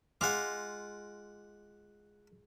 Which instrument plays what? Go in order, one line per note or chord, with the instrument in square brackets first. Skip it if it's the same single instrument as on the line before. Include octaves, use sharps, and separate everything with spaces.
[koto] G#3 F4 [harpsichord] F#5 D6